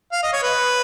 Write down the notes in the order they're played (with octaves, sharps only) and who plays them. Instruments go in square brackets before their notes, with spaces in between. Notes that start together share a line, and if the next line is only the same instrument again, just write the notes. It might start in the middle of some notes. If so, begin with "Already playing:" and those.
[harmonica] F5
D#5
C#5
B4